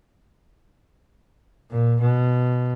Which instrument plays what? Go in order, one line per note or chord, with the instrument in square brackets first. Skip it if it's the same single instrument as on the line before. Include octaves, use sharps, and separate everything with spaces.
[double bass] A#2
B2